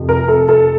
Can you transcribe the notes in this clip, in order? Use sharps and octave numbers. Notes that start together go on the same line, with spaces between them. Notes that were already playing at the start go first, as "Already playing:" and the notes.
Already playing: F1 F2 C3 F3
A#4
A4
A4